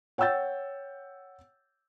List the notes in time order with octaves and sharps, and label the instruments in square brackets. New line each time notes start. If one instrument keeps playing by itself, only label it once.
[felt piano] C#5 F#5 G5 E6 G6 A6